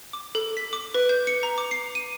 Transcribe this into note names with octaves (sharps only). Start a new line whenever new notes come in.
D6
A4
B6
D6
B4
G6
C#7
A#5
D6
C7
D#7